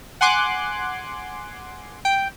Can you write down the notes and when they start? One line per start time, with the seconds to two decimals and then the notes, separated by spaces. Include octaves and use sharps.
0.21 F#5 G#5 C6 D6 F#6
2.05 G5